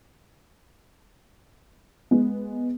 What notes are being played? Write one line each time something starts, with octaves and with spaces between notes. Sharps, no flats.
G#3 B3